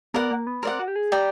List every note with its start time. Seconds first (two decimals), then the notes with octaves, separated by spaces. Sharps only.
0.14 B3 A#4 D5 F#5
0.31 A#3
0.47 B3
0.63 C4 A#4 D5 F#5
0.79 F#4
0.88 G4
0.96 G#4
1.12 G4 D5 G5 A#5